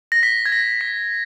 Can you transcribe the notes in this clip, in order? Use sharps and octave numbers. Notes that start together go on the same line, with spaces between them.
A#6
B6
G#6
A#6
B6